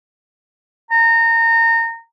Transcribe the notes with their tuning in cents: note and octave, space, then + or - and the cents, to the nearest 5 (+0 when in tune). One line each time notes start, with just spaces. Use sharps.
A#5 -25